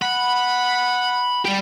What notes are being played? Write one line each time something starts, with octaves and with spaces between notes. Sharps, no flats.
F#5 B5
G3 G4